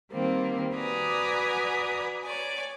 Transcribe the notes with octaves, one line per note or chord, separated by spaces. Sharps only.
D#3 G3 A#3 C4
F#4 B4 D5 G#5 A#5 D#6
C#5 D5 G#5